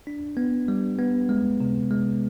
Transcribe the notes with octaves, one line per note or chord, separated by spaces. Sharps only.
D4
B3
G3
B3
G#3
C3
G#3